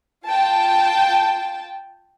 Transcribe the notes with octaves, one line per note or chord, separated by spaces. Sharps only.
F4 G5 A5